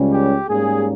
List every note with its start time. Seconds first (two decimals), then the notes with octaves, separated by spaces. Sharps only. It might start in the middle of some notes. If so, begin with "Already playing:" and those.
Already playing: C#2 C#3 G3 C#4
0.13 G4
0.48 G#2 G3 A#3 C#4 G#4